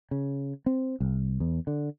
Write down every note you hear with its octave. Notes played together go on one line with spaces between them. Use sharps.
C#3
C4
C2
E2
D3